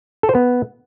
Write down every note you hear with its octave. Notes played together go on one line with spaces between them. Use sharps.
A4
C5
B3